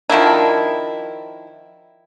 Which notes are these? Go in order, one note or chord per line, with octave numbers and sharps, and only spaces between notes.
D#3 F3 D4 E4